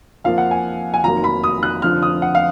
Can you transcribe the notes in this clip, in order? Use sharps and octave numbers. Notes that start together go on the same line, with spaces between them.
F2 F3 A#3 F5
F#5
G#5
G#5
F1 F2 D#3 F#3 A#3 A#5
B5
D#6
F#6
F1 F2 D3 F3 F6
D#6
F#5
F5